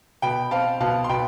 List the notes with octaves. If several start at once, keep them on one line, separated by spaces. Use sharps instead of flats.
B2 G5 B5
C4 F5 A5
B2 F5 A5
C6
B2 G5 B5